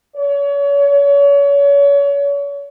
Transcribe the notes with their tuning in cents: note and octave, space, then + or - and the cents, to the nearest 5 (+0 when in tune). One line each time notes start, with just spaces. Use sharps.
C#5 +35